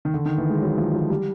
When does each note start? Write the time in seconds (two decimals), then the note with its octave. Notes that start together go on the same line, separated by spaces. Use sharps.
0.05 D#3
0.14 D3
0.26 D#3
0.38 E3
0.50 G#3
0.62 F#3
0.78 F3
0.94 F#3
1.10 G3